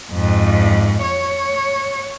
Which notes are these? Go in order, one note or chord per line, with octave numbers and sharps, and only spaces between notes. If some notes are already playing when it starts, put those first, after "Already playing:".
F2 G#2
C#5